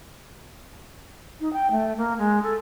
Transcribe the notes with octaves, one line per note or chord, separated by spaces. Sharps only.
D#4
G5
A3
A#3
G#3
A4